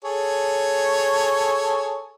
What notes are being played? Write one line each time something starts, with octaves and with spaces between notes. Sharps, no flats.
G#4 A4 C#5